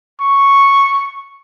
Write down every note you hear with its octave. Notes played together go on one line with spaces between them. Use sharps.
C#6